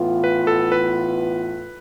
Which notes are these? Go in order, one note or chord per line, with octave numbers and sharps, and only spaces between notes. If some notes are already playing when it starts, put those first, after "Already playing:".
Already playing: A2 E3 B3 F4
B4
A4
B4